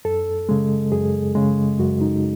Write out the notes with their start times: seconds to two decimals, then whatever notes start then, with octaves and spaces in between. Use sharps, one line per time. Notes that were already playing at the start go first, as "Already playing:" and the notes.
0.05 F#2 A4
0.49 C#3 G#3
0.92 F#2 G#4
1.35 C#3 G#3
1.79 F#2 F#4
2.01 D#4